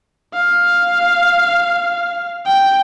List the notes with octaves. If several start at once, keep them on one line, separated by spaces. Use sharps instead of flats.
F5
G5